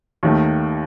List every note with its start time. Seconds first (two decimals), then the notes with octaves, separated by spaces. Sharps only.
0.23 D#2 D#3 A3